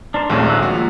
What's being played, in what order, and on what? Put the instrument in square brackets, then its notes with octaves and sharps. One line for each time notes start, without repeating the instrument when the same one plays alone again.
[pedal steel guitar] D4 A#4 C5
[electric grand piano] A#1 D#2 G#3 [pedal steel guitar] A3 C4 C#4
[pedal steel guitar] E6 F#6
[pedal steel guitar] F3 A#3 [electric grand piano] F#4